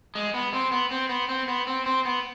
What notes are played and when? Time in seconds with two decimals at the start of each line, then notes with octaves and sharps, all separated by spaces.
0.15 G#3
0.34 B3
0.53 C4
0.71 B3
0.91 C4
1.09 B3
1.29 C4
1.48 B3
1.67 C4
1.86 C4
2.05 B3